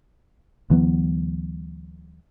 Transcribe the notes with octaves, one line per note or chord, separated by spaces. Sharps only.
D2 E3 F#3 B3